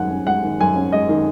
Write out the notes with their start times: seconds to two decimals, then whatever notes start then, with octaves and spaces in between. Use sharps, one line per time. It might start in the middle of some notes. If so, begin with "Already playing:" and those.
Already playing: F#2 D#3 G#3 F#5 G#5
0.11 C#4
0.27 G#3 F#5
0.44 D#3
0.60 F#2 G#5
0.76 C#4
0.92 G#3 D#5
1.09 D#3